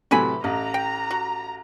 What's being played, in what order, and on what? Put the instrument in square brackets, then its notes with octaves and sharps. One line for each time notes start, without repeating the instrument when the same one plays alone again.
[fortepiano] A2 C3 F#3 [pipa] E3 G#5 B5
[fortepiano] A1 [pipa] D#5 [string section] A#5
[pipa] G5
F#4